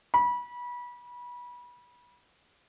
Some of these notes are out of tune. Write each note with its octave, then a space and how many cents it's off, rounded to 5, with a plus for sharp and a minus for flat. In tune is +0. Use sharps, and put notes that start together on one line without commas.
B5 -25